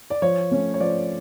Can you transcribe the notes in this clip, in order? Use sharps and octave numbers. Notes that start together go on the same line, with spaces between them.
D5
F3 C#5
A3 C#4
C#5
F3 D5